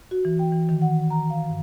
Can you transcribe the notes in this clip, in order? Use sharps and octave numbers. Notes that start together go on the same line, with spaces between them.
F#4
E3
G5
E3
D#3
F#5
A#5
F5
G2